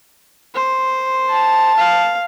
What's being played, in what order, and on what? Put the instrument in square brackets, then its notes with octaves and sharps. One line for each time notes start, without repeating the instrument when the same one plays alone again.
[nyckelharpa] C5
[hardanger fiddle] A5
[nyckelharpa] F5